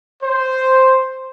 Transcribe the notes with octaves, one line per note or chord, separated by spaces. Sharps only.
C5